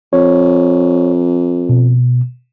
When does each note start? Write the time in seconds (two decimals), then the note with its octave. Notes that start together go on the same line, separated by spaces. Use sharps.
0.13 F2 C#5
1.69 B2